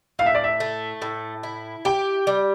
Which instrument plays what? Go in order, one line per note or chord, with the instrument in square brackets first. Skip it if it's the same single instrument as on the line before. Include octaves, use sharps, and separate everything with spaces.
[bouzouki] A2 [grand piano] F5
[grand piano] E5
D5
E5
[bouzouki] A3
A2
E4
[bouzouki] G4 [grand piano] G5
[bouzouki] G3